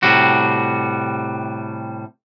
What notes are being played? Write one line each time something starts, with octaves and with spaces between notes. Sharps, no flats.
A2 C3 G3 F#4